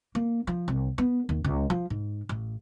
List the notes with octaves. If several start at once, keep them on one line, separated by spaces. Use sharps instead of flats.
A#3
F3
C2
B3
D#2
C#2
F3
G#2
A1